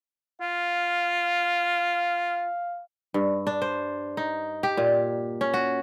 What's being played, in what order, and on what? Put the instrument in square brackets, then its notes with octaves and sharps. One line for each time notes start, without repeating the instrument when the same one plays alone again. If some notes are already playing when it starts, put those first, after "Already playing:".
[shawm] F4 [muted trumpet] F5
[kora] G2
D4
C5
D#4
G4
A#2
C#4
F#4